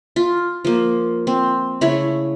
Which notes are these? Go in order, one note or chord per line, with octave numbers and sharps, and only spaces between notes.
F4
F3 A#3
C4
C#3 A3 E4 C#5